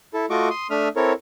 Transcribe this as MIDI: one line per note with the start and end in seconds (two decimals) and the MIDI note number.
0.14 0.26 64
0.14 0.26 69
0.30 0.49 57
0.30 0.49 65
0.30 0.49 66
0.30 0.49 75
0.30 0.49 85
0.30 0.49 86
0.50 0.67 84
0.50 0.67 87
0.70 0.88 57
0.70 0.88 62
0.70 0.88 76
0.70 0.88 87
0.70 0.88 89
0.96 1.13 60
0.96 1.13 64
0.96 1.13 69
0.96 1.13 70
0.96 1.13 73